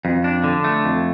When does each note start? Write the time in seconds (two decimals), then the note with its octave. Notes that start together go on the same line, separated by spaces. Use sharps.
0.05 F2
0.24 D4
0.44 D3
0.64 A3
0.84 F2